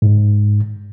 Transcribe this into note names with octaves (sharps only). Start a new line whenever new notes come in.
G#2